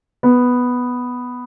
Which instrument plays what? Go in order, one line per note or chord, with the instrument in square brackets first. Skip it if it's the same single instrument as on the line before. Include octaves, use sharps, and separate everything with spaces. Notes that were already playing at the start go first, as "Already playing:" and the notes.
[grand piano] B3